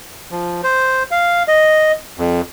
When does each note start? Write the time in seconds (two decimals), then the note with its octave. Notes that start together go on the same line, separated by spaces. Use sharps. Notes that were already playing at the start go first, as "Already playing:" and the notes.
0.31 F3
0.64 C5
1.11 F5
1.48 D#5
2.18 F2